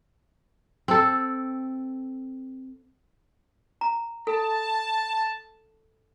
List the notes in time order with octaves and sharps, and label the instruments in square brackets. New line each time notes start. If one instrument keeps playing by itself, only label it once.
[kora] C4 A4
[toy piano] A#5
[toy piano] A4 [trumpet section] A5